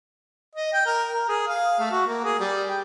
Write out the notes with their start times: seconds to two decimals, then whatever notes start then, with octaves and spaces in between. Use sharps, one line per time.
0.55 D#5
0.73 G5
0.86 A#4
1.12 A#4
1.28 G#4
1.48 F5
1.79 A3
1.91 F#4
2.07 A#3
2.24 G#4
2.39 G3
2.69 G5